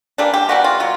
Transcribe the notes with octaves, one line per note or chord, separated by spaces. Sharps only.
E3 G3 A#3 D4
G4
E3 G3 A#3 F#4
F4
B2 F#3 F4